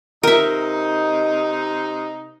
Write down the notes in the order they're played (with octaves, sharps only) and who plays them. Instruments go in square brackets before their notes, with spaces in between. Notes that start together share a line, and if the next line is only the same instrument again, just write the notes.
[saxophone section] C3 D#4 [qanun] A#4 E5